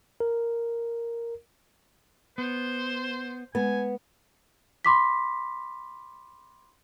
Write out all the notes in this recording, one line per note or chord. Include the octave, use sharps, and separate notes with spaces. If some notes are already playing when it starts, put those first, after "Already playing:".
A#4
B3 C5
G#3 B3 G#5
B5 C6 D6 B6